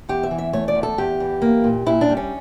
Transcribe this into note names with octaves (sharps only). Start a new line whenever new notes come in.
E2 G4
E5
E3
E5
A3 C#5
D5
E2
A4
E2 G4
E3
A#3
A#2
A#2 E4
D4
G3
C#4